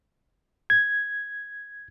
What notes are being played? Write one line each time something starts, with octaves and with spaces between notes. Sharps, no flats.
G#6